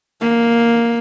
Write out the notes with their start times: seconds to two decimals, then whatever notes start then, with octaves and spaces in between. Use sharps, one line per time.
0.21 A#3